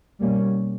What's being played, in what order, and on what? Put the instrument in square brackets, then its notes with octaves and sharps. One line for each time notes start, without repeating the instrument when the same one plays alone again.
[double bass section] B2 G3 A#3 C#4